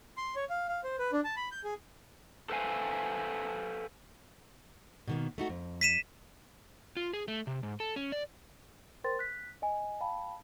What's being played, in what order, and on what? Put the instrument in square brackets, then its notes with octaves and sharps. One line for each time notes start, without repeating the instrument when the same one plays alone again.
[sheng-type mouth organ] C6
C#5
F5
F5
C5
B4
D4
A5
B5
G6
G#4
[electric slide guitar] A4 B4 C5 E5 F5 G#5
[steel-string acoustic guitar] B2 D#3 A#3
A3 D#4 F#4
F2
[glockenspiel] B6 D#7 E7
[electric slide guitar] F4
G#4
A3
C3
G#2
A4
C#4
D5
[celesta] A#4 C5 G5 C6 A6
F#6 B6
D#5 G#5
F5 G5 A5 B5